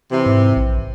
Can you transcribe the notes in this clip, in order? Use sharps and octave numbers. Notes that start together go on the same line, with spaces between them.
C3 E3
G#2
A#1